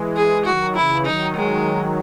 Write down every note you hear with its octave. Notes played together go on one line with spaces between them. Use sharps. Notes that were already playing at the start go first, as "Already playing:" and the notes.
Already playing: E3 G#3
G#4
D#3 F#3 F#4
C#3 E3 E4
D#3 F#3 D#4
G#3